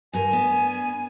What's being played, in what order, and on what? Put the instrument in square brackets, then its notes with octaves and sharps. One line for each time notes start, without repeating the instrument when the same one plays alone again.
[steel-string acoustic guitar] G2 A#4 [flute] G#5
[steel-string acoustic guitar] B3 D4